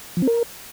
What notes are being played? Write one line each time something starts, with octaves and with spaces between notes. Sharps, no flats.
F3
C4
A#4